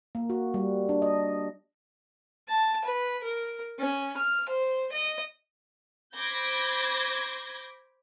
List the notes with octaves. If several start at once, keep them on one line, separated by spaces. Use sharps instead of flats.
A#3
F#4
G3
D4
D#5
A5
B4
A#4
C#4
F6
C5
D#5
C5 B5 D6 G6 G#6 A#6